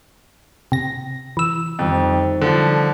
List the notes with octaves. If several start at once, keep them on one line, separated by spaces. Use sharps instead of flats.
C3 A#6
E3 E6
F2 C3 D#3 G3
D3 F3